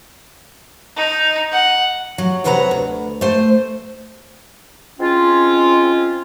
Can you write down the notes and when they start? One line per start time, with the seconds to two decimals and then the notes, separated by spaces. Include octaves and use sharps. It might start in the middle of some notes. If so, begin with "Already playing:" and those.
0.97 D#4
1.52 F#5
2.18 F#3
2.44 E2 C3 F#3 B4 F#5 A#5
2.71 D2
3.21 A3 C5
4.99 G#3 C4 C#4 F4